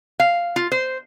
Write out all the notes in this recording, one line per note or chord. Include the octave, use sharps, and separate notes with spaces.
F5
F4
C5